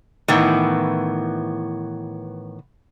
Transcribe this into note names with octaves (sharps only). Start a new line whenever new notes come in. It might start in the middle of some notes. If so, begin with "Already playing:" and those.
A2 D#3 E3 B3